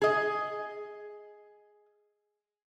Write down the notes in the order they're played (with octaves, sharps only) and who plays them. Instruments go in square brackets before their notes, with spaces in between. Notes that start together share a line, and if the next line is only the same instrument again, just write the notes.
[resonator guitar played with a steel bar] G#4 D#5